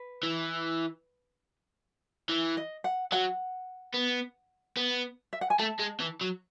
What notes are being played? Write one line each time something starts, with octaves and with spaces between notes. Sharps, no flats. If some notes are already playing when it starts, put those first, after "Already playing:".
Already playing: B4
E3
E3
D#5
F#5
F#3 F#5
B3
B3
E5
F#5
G#5
A3 A5
G#3
E3
F#3